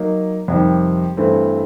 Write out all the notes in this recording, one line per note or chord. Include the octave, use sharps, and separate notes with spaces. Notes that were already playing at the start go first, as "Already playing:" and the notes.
Already playing: F#3 A#3 D#4
F2 C3 D#3 G3
G2 E3 A3 C4